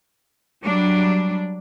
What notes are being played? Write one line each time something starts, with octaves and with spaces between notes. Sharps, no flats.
F#3 G3 D4